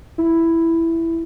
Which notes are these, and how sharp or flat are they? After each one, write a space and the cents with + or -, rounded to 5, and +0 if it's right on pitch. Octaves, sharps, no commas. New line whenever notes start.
E4 +5